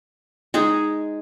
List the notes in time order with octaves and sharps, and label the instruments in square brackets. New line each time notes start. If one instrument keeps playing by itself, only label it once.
[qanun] G#3 D#4 G#4